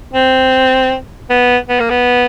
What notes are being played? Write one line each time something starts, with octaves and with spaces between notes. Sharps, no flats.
C4
B3
B3
A#3
B3